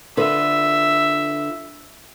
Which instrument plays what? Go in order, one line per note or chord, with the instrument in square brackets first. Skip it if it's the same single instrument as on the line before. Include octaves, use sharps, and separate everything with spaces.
[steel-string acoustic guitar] D3 F4 B4 [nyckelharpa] E5